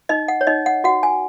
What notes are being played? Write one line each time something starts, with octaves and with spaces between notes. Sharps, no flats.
D#4 D#5
F#5
C#5
D#4 D#5
F#5
F#4 F#5
G#5